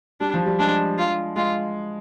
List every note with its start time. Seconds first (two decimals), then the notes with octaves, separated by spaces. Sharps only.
0.20 G3 D4
0.34 F3
0.46 G3
0.59 G#3 D4
0.98 F4
1.36 G#3 F4